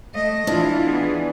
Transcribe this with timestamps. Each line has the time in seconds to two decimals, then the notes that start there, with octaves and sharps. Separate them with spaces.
0.14 A3 D#5
0.47 E3 D4 E4 F4
0.85 B3 G#4